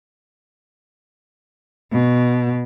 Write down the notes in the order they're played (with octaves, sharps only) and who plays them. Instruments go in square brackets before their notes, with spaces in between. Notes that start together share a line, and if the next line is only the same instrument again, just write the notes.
[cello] B2